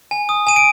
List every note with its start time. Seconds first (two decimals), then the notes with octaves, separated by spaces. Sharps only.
0.11 G#5
0.29 D#6
0.47 G#5 D#7
0.56 D7